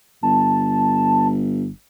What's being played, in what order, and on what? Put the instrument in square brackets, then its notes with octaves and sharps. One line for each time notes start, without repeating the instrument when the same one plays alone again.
[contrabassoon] G1 [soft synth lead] A5